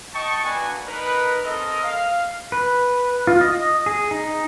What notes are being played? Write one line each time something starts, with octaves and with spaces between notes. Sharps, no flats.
D#5 G5 A5 C#6
A#3 D4 F#4 B4 G#5
D#4 A#4 B4
C4 A4 A#4 D#5
F5
B4
F4
D#5
G#4
D#4